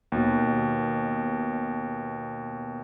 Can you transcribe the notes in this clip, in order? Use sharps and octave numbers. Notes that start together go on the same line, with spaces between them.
D#2 B2